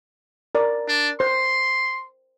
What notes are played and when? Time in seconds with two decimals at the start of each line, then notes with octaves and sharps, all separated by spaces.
0.55 A#4 D5
0.88 D4
1.20 C5 C6